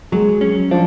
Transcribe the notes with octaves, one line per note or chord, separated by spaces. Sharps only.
F#3 G#3
C#4
F3 D4